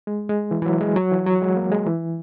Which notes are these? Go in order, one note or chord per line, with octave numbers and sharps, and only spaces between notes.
G#3
G#3
E3
E3
F#3
G#3
F#3
E3
F#3
G#3
A#3
G#3
E3